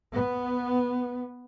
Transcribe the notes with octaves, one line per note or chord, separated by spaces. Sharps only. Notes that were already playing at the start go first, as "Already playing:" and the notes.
B3